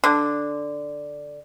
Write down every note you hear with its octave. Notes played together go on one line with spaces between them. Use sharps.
D3